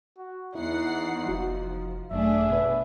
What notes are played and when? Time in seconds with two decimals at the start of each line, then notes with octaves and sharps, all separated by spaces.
0.17 F#4
0.55 E2 D#4 E4 F#5 C7
1.28 F1 F3 F#4
2.11 G#1 F#2 A3 D4 G#4 E5
2.49 B2 B4